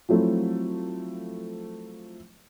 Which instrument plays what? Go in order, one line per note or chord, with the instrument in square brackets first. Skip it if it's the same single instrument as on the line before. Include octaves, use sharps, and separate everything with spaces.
[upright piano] F3 F#3 A3 C4 E4